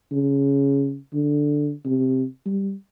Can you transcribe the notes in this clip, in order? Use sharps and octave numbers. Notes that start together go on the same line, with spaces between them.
C#3
D3
C3
G3